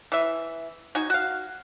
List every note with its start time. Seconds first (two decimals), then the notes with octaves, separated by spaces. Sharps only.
0.12 E3 E5
0.95 D#4 F#4 G#5
1.10 F#4 F5